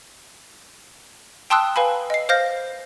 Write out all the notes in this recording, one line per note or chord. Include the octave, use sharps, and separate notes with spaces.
G5 A5 C6 D#6 E6 F#6
B4 F5 G#5 B5
D#5 C7
C5 F5 F6 G6 A#6